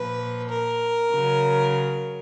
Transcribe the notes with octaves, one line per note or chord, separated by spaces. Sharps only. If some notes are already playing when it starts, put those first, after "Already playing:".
Already playing: A#2 F3 B4
A#4
C#3 F#3